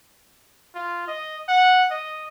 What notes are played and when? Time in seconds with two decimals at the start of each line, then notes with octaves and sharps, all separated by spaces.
0.75 F4
1.08 D#5
1.48 F#5
1.91 D#5